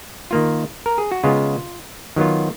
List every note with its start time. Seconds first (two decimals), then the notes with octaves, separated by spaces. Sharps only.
0.31 D#3 A#3 F4
0.86 A#4
0.98 G#4
1.11 F#4
1.24 C#3 G#3 B3 F4
2.16 D#3 F#3 B3 F4